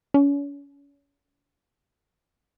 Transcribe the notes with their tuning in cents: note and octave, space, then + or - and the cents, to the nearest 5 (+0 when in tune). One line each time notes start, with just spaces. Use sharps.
C#4 +35